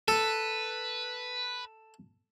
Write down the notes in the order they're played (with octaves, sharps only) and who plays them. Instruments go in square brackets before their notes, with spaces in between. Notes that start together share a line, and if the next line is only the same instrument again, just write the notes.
[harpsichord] A4 [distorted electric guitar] B4